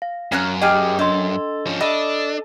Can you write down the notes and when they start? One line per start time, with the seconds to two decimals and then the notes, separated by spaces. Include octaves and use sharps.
0.02 F5
0.32 F#2 C#4 A#4 F#6
0.62 G4 G#4 D#5 F6
0.99 D4 A4 D#5 C6
1.67 F3 C#4
1.80 D4 A4 D#5 B5